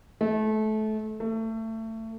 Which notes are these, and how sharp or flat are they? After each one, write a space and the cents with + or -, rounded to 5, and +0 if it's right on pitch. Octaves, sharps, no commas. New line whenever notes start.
A3 -25
A3 +25